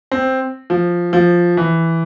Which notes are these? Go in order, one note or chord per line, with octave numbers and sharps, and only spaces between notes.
C4
F3
F3
E3